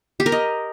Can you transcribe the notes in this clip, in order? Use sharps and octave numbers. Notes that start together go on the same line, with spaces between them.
G4
A#4
D#5